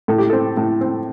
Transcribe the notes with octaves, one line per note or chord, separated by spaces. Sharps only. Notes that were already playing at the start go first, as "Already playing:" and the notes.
A2 A4
G4
C4 A4
A2
C4